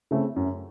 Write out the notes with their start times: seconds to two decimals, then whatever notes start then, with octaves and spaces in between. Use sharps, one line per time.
0.11 C#3 A3 C4
0.36 F#2